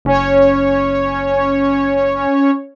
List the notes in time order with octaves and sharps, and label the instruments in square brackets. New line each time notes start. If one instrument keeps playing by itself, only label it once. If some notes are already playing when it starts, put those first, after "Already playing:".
[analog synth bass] F#1 [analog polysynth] C#4 C#5